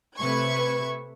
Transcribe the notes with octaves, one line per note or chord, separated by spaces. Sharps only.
C3 A3 B4 E5 C#6 G#6